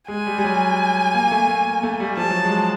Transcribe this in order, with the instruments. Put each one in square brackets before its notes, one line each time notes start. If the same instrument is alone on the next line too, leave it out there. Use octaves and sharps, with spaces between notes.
[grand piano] G#3 [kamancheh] G#5
[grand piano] G3
G3
F#3
A#3
A3
A#3
A#3
A3
G3
[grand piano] F3 [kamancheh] A5
[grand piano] F#3
G#3